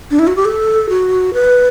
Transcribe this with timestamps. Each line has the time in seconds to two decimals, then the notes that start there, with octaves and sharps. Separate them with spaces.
0.11 D4
0.19 E4
0.27 F#4
0.36 G4
0.45 A4
0.89 F#4
1.34 B4